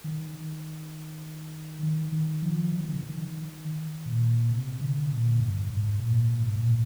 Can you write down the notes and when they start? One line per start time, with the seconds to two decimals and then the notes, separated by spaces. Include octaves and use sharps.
0.04 D#3
1.83 D#3
2.12 D#3
2.42 F3
2.73 F3
2.81 D#3
2.88 D3
2.97 D#3
4.06 A#2
4.51 C3
4.81 D3
5.10 A#2
5.40 G2
5.70 G#2
6.00 A#2
6.30 A#2
6.43 G#2
6.56 A#2